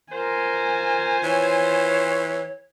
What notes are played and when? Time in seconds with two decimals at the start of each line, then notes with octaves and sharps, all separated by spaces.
0.12 F4 A#4 C5 G#5
1.23 E3 C#5